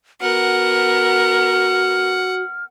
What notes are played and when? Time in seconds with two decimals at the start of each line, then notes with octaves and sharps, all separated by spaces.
0.21 B3 F#4 A#4 F#5 F6